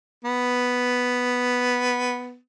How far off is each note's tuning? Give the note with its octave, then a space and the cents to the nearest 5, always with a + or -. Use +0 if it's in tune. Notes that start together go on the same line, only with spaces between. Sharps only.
B3 +0